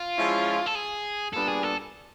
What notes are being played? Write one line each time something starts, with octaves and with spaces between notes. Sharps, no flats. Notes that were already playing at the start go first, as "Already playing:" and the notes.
Already playing: F4
F3 G#3 C#4 E4
A4
G#4
A#2 G3 B3 D4 A4
G#4
A4